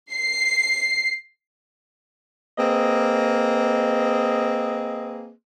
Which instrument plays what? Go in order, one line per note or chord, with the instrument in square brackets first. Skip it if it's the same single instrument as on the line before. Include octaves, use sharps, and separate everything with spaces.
[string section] C7
[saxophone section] A#3 C4 G#4 B4 D#5